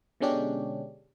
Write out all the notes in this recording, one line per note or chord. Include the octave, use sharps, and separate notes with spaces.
B2 D3 G#3 C#4 D4 G4